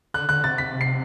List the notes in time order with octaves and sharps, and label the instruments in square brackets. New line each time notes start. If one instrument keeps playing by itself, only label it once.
[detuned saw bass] D3 [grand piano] F#6
[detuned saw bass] D3 [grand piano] F#6
[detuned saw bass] C3 [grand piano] A6
[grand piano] B6
C7